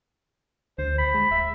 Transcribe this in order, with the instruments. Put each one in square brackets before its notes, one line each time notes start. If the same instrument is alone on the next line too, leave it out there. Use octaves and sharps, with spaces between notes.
[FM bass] D2 [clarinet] C5
[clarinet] B5
[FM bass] G#3
[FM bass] D1 [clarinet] E5